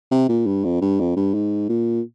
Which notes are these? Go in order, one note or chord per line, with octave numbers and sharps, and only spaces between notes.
C3
A#2
G2
F2
G2
F2
G2
G#2
A#2